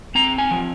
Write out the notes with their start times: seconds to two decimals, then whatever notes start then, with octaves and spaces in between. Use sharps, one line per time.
0.15 C4 A#5
0.38 G#5
0.51 F3